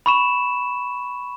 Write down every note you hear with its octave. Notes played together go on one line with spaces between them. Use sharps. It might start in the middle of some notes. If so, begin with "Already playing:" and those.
B5 C#6 E7